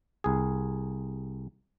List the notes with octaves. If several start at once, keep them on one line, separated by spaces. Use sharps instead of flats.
C2 G#4